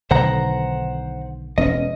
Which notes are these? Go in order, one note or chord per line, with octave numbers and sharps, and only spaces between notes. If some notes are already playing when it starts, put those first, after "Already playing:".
B1 D3 D#3 C5 F#5 A#5
E1 C4 C#4 D#5